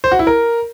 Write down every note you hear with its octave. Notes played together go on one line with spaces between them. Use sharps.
C5
F#4
E4
A#4